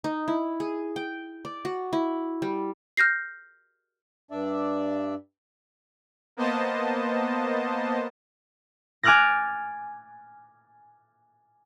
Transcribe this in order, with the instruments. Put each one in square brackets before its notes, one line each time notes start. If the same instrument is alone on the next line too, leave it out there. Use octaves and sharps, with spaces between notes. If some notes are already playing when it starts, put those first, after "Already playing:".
[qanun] D#4
E4
G#4
G5
D5
F#4
E4
G3
[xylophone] F6 G6 A#6 C7
[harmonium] G2 D4 D5 E5
[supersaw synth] A#3 B3 C5 D#5 A5
[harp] G#5 D6 F6 F#6 A6 A#6